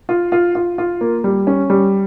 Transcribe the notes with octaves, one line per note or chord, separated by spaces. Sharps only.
F4
F4
F4
F4
A#3
G3
C#4
G3